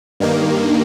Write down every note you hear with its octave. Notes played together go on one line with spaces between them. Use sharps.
G2 D#3 A#3